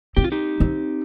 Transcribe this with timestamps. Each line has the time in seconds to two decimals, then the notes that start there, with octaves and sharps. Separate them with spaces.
0.17 C4 G4
0.24 F4
0.32 D#4 G4
0.60 C4